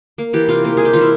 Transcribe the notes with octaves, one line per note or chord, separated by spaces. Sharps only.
A#3
E3 G4
C3 F4
A#3
G#3 G#4
G4
E3 F4
E4